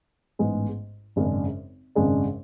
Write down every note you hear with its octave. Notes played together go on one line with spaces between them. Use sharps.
A1 G#2 G#3 B3
G#1 F#2 C#3 G#3 D4
G#1 F#2 C#3 G#3 D4